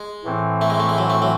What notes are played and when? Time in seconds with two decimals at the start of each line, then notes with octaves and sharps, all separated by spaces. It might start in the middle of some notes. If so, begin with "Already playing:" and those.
Already playing: G#3
0.24 A2 E3 C4
0.61 A3
0.70 G#3
0.79 A3
0.89 G#3
0.98 F#3
1.10 A3
1.22 F#3